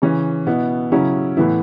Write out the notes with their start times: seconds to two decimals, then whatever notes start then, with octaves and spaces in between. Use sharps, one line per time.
0.02 C#3 E3 C#4
0.46 B2 B3 E4
0.92 C#3 F#3 C#4 E4
1.37 A2 E3 B3 E4